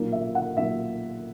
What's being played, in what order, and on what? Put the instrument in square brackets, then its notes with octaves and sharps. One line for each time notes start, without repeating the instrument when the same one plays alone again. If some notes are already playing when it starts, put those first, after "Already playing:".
Already playing: [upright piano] B1 A#2 A#3
E5
F#5
B1 A#2 A#3 E5